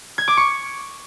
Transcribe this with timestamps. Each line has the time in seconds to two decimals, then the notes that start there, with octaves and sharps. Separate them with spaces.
0.18 G#6
0.28 D6
0.37 C#6